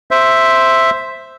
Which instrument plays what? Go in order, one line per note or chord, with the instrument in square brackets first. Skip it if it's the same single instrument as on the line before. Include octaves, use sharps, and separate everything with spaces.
[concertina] C5 E5